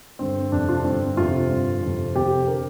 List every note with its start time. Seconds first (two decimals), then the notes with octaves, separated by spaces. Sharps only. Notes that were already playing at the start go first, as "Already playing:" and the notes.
0.19 G2 D3 C4
0.52 F2 C3 D4
0.69 F4
0.77 D4
0.84 G2 D3 C4
1.17 F2 C3 F4
1.50 G2 D3
1.83 F2 C3
2.15 F2 C3 G4
2.47 D3 A#4